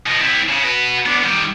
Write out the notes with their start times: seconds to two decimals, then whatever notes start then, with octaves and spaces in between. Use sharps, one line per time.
0.06 F3 D#4
0.21 C4 E4
0.49 C#3
0.64 F#4 B4
1.06 B3 D4
1.23 D#3 G3